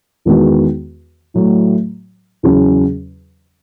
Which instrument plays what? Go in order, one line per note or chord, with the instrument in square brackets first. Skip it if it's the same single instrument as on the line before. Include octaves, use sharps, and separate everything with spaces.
[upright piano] E2 D#3 G#3 B3 F#4
A2 F#3 A3
E2 C#3 F#3 C#4 G#4